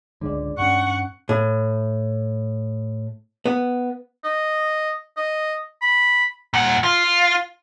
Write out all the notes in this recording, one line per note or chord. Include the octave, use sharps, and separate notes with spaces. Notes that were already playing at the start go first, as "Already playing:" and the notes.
C#2 G#2 D3 G#3 D5
G2 C#4 F#5 C#6
A2
B3
D#5
D#5
B5
A#2 F#5
F4